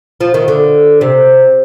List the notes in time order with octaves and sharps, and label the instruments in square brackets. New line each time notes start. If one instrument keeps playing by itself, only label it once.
[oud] F3
D#3
D3
C3